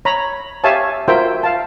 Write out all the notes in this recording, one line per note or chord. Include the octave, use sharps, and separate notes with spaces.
C#5 A#5 B5
G4 C#5 E5 F5 G#5 A5
F4 F#4 A#4 C5 E5 G5
F5 A5